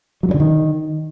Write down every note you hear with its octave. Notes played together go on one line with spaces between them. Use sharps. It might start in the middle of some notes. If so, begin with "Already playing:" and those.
F#3
G2
D3
D#3